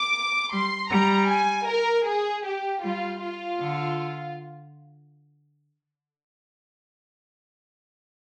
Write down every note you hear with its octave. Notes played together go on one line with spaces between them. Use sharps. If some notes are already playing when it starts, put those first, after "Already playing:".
Already playing: D6
G3 C6
G3 A#5
G#5
A#4
G#4
G4
G3 F4
F4
D3